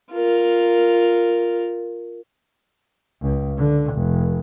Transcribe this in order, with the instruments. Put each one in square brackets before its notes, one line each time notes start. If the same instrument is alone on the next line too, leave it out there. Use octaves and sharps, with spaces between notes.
[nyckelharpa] F4 A#4
[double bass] C#2
D3
F1